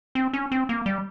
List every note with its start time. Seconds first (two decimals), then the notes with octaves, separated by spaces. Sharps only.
0.15 C4
0.33 C#4
0.52 C4
0.69 A#3
0.86 G3